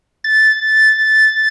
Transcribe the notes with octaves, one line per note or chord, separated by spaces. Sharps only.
A6